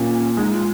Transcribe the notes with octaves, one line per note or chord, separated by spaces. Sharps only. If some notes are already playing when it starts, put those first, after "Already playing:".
Already playing: A#2 C#4
G#3 D#4
F4